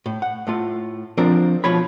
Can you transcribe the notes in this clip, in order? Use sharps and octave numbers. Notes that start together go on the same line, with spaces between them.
A2
F#5
A2 A3 F4
F3 C4 D4 A#4 C5
B2 F3 F4 C#5 B5